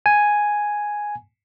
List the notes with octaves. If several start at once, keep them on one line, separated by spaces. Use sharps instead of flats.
G#5